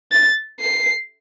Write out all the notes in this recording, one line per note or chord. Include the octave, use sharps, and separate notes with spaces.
A6
C7